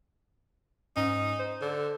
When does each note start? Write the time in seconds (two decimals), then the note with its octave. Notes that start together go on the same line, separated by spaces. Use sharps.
0.96 G#2 C#4 D#4
1.39 C5
1.61 D3